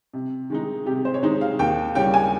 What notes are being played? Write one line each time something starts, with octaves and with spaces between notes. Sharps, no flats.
C3
D#3 G#3 D#4
C3 G4
C5
C#5
D#3 G#3 D#4 C5
F5
D#2 G5
C#3 G3 C#4 G5
G#5